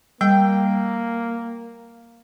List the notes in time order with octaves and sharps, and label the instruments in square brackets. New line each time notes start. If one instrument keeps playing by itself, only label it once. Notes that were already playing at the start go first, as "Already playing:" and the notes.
[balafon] G3 [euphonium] A#3 [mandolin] G5